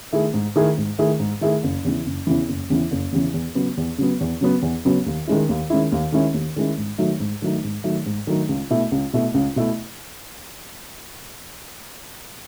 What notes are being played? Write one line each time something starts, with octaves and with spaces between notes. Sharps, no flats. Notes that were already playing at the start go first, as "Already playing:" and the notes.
D#3 A3 E4 G#4
G#2
D#3 A3 E4 G#4
G#2
D#3 A3 E4 G#4
G#2
D#3 A3 E4 G#4
F#1
E2 C#3 E3
F#1
E2 C#3 E3
F#1
E2 C#3 E3
F#1
E2 C#3 E3
E2
C#3 F#3 B3
E2
C#3 F#3 B3
E2
C#3 F#3 B3
E2
C#3 F#3 B3
D#2
D#3 G#3 C#4 E4
D#2
D#3 G#3 C#4 E4
D#2
D#3 G#3 C#4 E4
D#2
D#3 G#3 C#4 E4
G#2
D#3 F#3 A3 D#4
G#2
D#3 F#3 A3 D#4
G#2
D#3 F#3 A3 D#4
G#2
D#3 F#3 A3 D#4
C#2
B2 A3 E4
C#2
B2 A3 E4
C#2
B2 A3 E4